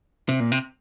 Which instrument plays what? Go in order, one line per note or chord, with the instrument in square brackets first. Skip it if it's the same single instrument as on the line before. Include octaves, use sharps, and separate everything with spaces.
[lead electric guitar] C3
A#2
C3